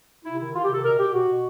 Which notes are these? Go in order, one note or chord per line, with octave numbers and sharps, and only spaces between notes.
C3 E4
D#3 E4
D#3 F4
G4
C3 A4
B2 A#4
B2 G4
B2 F#4
B2